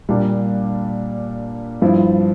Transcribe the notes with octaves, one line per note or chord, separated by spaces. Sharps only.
A#2 G3 A#3 D4
G2 F3 C4 E4